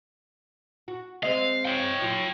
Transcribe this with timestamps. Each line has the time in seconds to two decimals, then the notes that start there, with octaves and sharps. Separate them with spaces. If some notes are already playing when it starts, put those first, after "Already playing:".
0.88 F#4
1.23 G#3 C4 D#5 F5
1.65 C#5 G5
2.02 F#3 F4